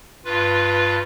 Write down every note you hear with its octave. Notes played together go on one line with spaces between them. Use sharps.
G2 F4 B4